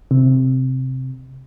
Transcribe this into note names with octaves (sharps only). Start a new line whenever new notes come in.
C3